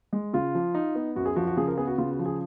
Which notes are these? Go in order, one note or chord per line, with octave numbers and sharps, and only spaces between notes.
G#3
C#3 F4
F3
D#4
B3
F#2 F#4
G#4
F3 F#4
F#4
C#3 G#4
A#4
B3 G#4
F#4
C#3 F4
F#4
F3
G#4